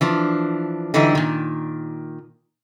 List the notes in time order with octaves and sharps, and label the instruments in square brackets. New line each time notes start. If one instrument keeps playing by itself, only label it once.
[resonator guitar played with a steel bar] E3 F3 D4
D3 E3 F#3 G3 D#4 E4
A#2 D#3